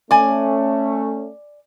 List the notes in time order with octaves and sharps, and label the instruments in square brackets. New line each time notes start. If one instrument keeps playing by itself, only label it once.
[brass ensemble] A3 C#4 [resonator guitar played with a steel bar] D5 G#5